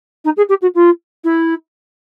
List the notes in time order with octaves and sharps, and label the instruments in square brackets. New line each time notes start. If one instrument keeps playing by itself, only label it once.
[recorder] D#4
G#4
G4
F#4
F4
E4